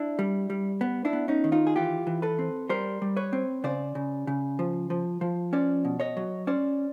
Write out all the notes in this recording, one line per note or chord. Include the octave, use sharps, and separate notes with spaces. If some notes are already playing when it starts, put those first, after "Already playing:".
Already playing: D4 E4
G3
G3
B3
D4 E4
B3
C#4 D#4
D#3
D#4 F4
G#4
E3 F4 G4
E3
A4 B4
C4
G3 A#4 C5
G3
B4 C#5
C4
C#3 C5 D5
C#3
C#3
F3
F3
F3
C#4 C5 D5
B2
C#5 D#5
F#3
C#4 C5 D5